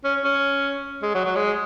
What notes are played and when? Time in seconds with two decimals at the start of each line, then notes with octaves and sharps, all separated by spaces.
0.04 C#4
0.24 C#4
1.02 G#3
1.14 F#3
1.25 F#3
1.36 G#3